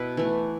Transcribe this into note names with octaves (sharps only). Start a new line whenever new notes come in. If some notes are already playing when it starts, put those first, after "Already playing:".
Already playing: B2 B3 E4 B4
E3 A3